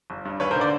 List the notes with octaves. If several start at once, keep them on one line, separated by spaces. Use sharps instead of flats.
G1
G2
D#2 B4 C#5
A#4 C5
D3
C5 D5